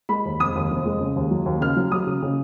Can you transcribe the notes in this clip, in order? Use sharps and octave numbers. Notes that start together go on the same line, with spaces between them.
G#3 B5
D#2
F1 D#6
D#2
F1
G#3
C#3
D#2
F#3
D#2
C#3 F6
F#3
F#3 D#6
C#3
C#3